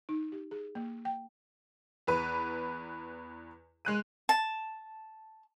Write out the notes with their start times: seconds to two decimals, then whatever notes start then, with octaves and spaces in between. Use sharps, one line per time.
0.09 D#4
0.32 G4
0.51 G#4
0.75 A#3
1.05 G5
2.07 E2 B4
3.85 G#3 F#6 D#7
4.29 A5